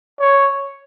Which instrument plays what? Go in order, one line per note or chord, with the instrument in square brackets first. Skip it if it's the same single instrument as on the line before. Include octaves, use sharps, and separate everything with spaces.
[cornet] C#5